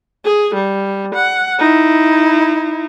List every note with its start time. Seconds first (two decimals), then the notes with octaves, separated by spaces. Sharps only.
0.25 G#4
0.54 G3
1.14 F#5
1.59 D#4 E4